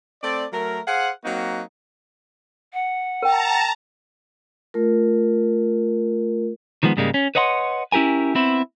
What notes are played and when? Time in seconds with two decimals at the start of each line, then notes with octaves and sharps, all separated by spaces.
0.23 A3 C4 D5
0.53 F#3 A3 A#4
0.87 G#4 C5 F5 F#5
1.24 F#3 A#3 C4 D#4 F#4
2.73 F#5
3.22 A#4 G5 A5 A#5
4.74 A3 F4 A#4
6.83 D#3 F3 G#3 B3
6.97 G#2 C#3 G3 G#3 A#3
7.14 C#4
7.35 B4 C#5 D#5 F#5 B5 C6
7.92 C#4 E4 G4 A#4 G#5
8.35 B3 C4 E4